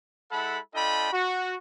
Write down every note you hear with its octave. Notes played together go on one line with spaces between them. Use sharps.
G#3 E4 A4 F#5 A5 B5
D4 F4 A4 D#5 G5 B5
F#4